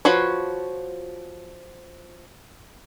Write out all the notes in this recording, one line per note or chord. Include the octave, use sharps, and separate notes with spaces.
F3 F4 F#4 B4 C#5